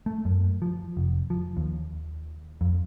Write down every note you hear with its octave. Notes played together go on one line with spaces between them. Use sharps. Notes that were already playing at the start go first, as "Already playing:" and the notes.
A3
F#2
F3
F1
F3
D#2
F2